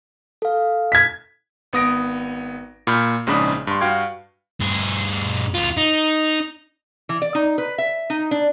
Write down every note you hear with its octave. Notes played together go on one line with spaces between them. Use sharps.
A4 F5
G#6 B6
G#1 B3 D#6 A#6 D7
A#2 B5 F6 G6
A#1 G#2 C#3 D4 B5 D#6
G2 C6
G2 F#4 F5 G5 G#6
G2 G#4
D2 F4
D#4
E3
D5
D#4
B4
E5
D#4
D4